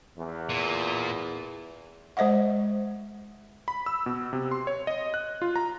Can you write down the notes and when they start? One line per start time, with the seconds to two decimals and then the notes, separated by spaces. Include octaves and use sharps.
0.17 E2
0.50 A#2
2.17 G#3 C5 D#5 E5 F#5
3.68 B5
3.86 E6
4.06 B2
4.33 C3
4.51 C6
4.67 C#5
4.87 D#5
5.14 F#6
5.42 F4
5.56 A#5